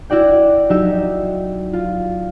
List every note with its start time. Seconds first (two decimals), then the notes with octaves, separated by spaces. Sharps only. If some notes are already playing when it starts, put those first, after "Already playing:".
0.10 E4 F#4 D5 G5
0.70 F#3 D#4 G4 E5
1.73 F4